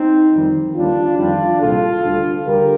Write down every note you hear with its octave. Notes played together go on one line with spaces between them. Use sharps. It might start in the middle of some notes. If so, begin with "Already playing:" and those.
Already playing: C4 D#4
F2 D#3 G3
D#2 D3 G3 D4 F4
F2 D#3 G3 D4 F4
C2 A#2 G3 F4 A4
D2 D3 G3
D2 D3 G3 G4 A#4